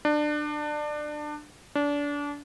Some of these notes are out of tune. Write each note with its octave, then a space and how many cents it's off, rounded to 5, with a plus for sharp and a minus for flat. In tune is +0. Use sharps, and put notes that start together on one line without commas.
D4 +25
D4 -25